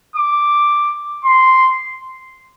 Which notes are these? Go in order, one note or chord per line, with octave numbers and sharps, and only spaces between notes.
D6
C6